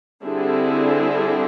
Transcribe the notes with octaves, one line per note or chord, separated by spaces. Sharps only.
D3 G3 C4 E4 G#4